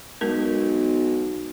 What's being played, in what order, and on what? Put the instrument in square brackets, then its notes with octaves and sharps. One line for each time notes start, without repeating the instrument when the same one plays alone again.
[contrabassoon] B1 [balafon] G#3 B3 A#4